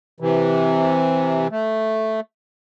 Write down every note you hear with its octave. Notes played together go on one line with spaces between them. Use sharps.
C3 E3
A3